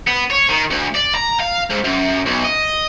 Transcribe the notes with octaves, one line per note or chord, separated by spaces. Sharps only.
B3
C#5
D#3
D2
D5
A#5
F5
G#2
F#2
B1
D#5